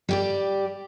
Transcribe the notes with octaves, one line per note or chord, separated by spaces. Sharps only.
G3 G4 D5